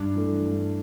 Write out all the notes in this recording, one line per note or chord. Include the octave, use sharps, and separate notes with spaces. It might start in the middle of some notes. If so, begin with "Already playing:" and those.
Already playing: G2 D4
E3 A3
G2